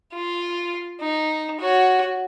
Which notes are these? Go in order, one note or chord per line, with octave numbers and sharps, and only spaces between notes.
F4
D#4
F#4 C#5